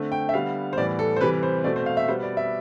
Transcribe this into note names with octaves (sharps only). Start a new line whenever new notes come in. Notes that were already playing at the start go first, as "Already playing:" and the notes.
Already playing: D3 A3 C4
G5
E5
D3 G3 B3 F5
C5
A2 E3 G3 B3 D5
A4
C5
C3 E3 G3 B4
C5
B2 A3 C4 D5
C5
F5
E5
B2 G3 B3 C5
D5
E5